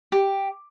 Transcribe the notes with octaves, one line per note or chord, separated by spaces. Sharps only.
G4